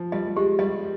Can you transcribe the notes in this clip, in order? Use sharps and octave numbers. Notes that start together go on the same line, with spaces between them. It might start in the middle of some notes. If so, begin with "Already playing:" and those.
Already playing: F3
G3 D#5
G3
G#3 G4
G3 D#5